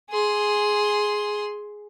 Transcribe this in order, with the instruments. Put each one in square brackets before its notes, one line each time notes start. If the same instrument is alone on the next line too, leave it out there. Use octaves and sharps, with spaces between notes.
[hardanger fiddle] G#4 C6